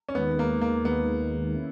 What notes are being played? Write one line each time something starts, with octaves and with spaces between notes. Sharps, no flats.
C#4
D#2 D#3 G#3 B3
A#3
A#3
D#2 D#3 G#3 B3
C#4 E4